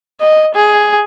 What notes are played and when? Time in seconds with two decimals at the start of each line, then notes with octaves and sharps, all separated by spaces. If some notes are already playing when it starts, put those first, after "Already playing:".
0.21 D#5
0.55 G#4